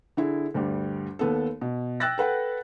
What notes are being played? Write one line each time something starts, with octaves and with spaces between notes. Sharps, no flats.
D3 E4 G#4
D2 G2 G3
D#2 B3 A4
B2
G5 E6 F#6 A6 A#6
A4 B4 F#5 G5